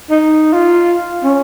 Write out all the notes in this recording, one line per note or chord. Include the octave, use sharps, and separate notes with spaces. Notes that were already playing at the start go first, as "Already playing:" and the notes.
D#4
F4
C#4